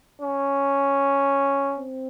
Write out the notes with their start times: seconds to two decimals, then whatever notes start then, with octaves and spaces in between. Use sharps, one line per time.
0.21 C#4
1.76 C4